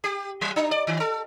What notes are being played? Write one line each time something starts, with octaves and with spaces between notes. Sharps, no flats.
G4
F#3
D4
D5
D#3
A4